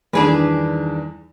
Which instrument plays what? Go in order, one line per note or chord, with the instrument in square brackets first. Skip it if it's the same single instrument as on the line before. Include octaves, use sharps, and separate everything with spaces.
[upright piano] E2 G2 D#3 [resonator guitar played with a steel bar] D4 G#4 B4